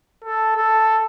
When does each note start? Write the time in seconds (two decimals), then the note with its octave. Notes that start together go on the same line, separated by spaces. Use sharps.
0.24 A4
0.56 A4